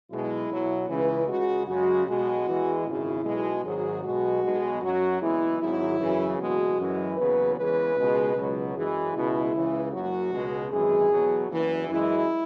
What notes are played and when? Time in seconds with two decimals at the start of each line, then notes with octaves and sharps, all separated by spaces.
0.11 B1 B2 G#3 E4
0.49 B1 B2 F#3
0.88 C#2 C#3 E3 B4
1.28 C#2 C#3 G#3 F#4
1.67 F#2 C#3 G#3 F#4
2.07 B1 B2 G#3 F#4
2.46 E2 E3 G#3
2.85 G#1 F#2 C#3 E4
3.24 B1 B2 G#3
3.63 G#1 G#2 F#3 G#4
4.04 B1 B2 G#3 F#4
4.43 B1 B2 G#3
4.81 F#2 F#3 F#4
5.21 F#1 E2 E3 G#3 E4
5.60 G#1 G#2 F#3 E4
5.99 F#2 C#3 E3
6.38 F#1 E2 B2 G#3 F#4
6.78 F#2 E3 G#3
7.17 F#1 E2 C#3 F#3 B4
7.56 E2 C#3 E3 G#3 B4
7.96 C#2 B2 G#3
8.35 C#2 B2 F#3
8.75 F#2 E3 G#3 G#4
9.14 C#2 B2 G#3 E4
9.54 C#2 C#3 E3
9.92 F#1 F#2 F#3 F#4
10.32 C#2 B2 G#3
10.71 G#1 F#2 E3 G#3 G#4
11.11 E2 B2 F#3
11.50 F#1 E2 E3
11.89 F#2 E3 G#3 E4